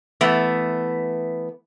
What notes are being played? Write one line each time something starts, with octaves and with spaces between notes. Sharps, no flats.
E3 A3 B3